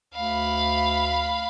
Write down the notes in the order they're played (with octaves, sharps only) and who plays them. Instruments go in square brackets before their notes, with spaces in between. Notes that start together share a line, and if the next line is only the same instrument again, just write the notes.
[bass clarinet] D2 [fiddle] F5 B5